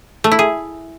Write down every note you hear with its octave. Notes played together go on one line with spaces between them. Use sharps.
A3
E4
G#4